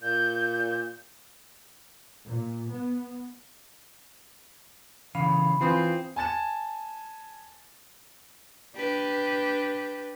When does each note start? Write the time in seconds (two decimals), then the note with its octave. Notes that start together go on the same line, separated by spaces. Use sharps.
0.02 A#2 G6
2.26 A#2
2.70 B3
5.15 C#3 E3 F5 B5
5.61 E3 C4 F4 C6 D#6
6.16 G#5 A5 A6 E7
8.76 D4 G4 B4